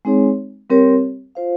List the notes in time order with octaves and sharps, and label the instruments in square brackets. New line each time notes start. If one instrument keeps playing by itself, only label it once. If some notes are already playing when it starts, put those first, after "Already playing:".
[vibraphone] G#3 C4 D#4 G#4 C#5
G3 C4 G4 A#4 C#5
F4 C5 F5